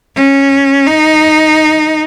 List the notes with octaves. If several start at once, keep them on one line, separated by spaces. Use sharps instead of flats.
C#4
D#4